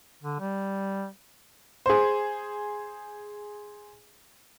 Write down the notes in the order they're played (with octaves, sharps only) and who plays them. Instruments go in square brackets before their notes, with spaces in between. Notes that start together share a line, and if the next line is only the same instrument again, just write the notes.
[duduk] D3
G3
[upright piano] G#4 C5